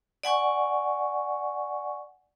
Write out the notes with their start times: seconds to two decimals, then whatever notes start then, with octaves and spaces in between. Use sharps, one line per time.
0.23 D5 F#5 G#5 C#6